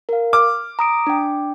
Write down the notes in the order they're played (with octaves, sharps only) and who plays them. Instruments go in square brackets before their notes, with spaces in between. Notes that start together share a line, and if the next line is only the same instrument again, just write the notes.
[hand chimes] A#4 F5
[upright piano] D6 [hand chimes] F6
[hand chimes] A#5 D#6 D7
D4 G5